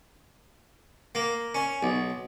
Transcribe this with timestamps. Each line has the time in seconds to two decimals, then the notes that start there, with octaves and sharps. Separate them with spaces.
1.15 A#3
1.55 C#4
1.83 B1